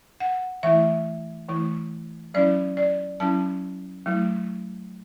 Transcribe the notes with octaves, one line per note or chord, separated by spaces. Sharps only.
F#5
E3 A3 E4 E5
E3 A3 E4
F#3 C#4 E4 D5
D5
F#3 C#4 E4 A5
F#3 A3 E4